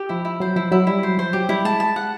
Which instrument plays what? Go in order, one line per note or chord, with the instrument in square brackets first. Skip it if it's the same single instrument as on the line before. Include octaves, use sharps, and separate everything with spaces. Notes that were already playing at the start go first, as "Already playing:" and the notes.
Already playing: [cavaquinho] G4
[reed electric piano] F3 [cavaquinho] E4
[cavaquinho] E4
[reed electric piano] F#3 [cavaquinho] C5
[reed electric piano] F3 [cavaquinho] E4
[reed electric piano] F#3 [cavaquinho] E4
[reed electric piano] G3 [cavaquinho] E4
[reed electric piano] F#3 [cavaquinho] C5
[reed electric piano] F3 [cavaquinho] C5
[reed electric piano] F#3 [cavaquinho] G4
[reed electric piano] G3 [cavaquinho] E4
[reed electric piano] G#3 [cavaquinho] A5
[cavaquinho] A5
F#5